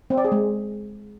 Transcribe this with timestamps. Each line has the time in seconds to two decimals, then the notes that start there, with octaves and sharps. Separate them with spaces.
0.10 C4
0.17 D5
0.25 G#4
0.32 G#3